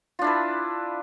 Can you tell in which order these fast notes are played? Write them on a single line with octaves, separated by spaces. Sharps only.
F4 D4 E4 B4